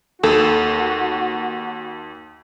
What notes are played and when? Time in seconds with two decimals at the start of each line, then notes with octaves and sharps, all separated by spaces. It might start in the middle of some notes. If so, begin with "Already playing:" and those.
0.23 D#2 F#4 A4